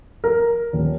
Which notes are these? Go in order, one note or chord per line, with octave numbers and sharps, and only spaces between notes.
A#4
D#1